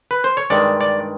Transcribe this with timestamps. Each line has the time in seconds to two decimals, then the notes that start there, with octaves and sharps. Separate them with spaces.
0.11 B4
0.24 C5
0.37 C#5
0.50 G2 D#3 G#3 D5
0.81 D5